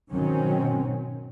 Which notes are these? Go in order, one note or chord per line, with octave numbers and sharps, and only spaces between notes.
G#2 B2 D#3 F#3 C4 C#4